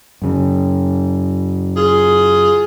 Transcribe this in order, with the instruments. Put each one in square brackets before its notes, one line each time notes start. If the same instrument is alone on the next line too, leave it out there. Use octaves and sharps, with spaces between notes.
[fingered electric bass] F#2 C#3
[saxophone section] F4 G#4